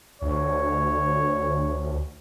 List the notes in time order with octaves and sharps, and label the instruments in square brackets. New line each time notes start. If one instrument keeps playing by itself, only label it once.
[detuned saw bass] D2 [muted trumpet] C#5